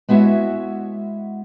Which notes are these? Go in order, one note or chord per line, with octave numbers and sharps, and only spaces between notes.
G#3 B3 E4 F#4 C#5 E5